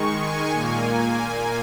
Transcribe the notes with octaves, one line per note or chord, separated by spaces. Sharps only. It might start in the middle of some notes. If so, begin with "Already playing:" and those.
Already playing: D#3 G#3 C#6
G#5
A#2 A#3